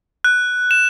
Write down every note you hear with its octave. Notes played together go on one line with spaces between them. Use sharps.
F#6
E7